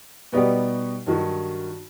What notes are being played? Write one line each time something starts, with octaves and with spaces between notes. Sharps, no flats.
B2 G3 B3 D#4 G4
G2 D#3 F#3